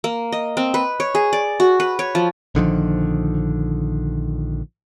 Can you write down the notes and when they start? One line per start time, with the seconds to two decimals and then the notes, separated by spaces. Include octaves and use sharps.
0.04 A#3
0.32 D#5
0.57 C4
0.74 B4
1.00 C#5
1.15 G#4
1.33 D5
1.60 F#4
1.80 B4
1.99 C#5
2.15 F3
2.55 A#1 D3 D#3 F3